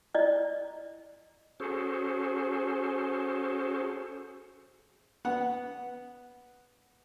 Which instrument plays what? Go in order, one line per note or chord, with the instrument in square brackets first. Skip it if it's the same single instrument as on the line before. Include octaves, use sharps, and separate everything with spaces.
[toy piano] E4 D5 D#5
[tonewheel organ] C#4 F#4 G#4 A4 C5
[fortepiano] B3 F#5